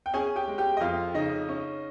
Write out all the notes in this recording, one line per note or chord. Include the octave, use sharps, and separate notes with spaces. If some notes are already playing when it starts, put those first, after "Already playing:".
G5
C#4 G#4 G#5
G4 G5
G#3
G4 G5
D#5
F2 F4 F5
C#3 D#4 D#5
C#4